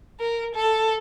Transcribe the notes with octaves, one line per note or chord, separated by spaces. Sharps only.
A#4
A4